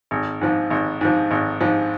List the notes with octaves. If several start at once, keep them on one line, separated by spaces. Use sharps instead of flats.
G#1
G#2 F3
G#1
G#2 F3
G#1
G#2 F3